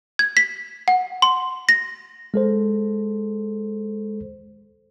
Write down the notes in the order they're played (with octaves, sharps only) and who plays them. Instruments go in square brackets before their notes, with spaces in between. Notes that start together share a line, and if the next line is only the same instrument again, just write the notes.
[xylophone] G#6
B6
F#5
C6
A#6
[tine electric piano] G#3 A4 C5